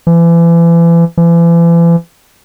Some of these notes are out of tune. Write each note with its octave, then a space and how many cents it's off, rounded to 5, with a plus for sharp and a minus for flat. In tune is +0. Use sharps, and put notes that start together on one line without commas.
E3 +35
E3 +40